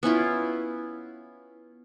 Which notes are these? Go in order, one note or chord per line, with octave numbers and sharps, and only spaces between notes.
B3 C#4 E4 F4